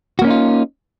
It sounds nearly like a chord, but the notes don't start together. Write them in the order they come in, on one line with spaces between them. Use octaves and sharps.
F#4 A#3 C#4 D#4 F4